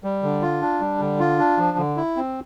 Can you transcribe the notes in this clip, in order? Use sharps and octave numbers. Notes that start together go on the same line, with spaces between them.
G3
D3
F4
D4
G3
D3
F4
D4
F3
D3
E4
C4